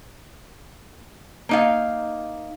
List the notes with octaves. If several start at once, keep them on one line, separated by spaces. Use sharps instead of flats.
A#3 D#4 F5